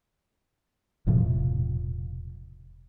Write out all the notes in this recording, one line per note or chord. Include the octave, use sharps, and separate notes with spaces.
E1 A2 C3 F3